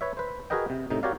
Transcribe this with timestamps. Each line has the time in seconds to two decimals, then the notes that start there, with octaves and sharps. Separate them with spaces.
0.01 B4 C#5 E5
0.17 B4 C5
0.50 F#4 G#4 A#4 B4 D#5 G5
0.70 C3
0.90 A2 C3 D#4
1.03 F#4 G4 A#4 C#5 D5 F5